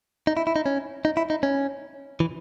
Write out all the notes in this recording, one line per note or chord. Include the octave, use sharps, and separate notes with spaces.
D#4
E4
E4
D#4
C#4
D#4
E4
D#4
C#4
E3